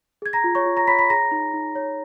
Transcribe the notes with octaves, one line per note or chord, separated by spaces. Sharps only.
G#4 G#6
A#5 A#6
F4
C#5 C#6
F4
A#5 A#6
C#5 B5 B6
B5 B6
G#4 A#5 A#6
D#4
D#4
C#5